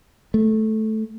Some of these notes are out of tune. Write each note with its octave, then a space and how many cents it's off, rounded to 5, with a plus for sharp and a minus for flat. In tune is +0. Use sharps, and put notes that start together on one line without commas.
A3 -10